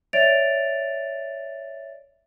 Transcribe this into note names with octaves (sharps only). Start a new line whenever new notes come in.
C#5 D5 E5 A6 D7 F7